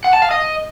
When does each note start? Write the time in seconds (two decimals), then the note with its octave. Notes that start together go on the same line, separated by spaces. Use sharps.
0.04 F#5
0.13 A5
0.22 F5
0.31 D#5